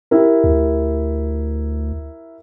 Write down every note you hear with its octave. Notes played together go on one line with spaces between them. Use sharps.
E4 G4 A#4
D2